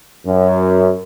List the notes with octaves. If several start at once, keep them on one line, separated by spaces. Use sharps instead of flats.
F#2